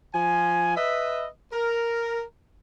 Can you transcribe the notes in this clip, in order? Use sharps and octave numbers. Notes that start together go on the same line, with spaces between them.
F3 G#5
B4 D#5 E5
A#4